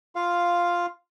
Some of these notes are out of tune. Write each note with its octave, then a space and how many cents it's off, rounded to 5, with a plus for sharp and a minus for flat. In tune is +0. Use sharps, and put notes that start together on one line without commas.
F4 +0 F5 +0